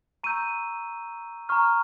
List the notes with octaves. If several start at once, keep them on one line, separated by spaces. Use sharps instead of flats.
A#5 C#6 E6 G6 D#7
A#5 C#6 F6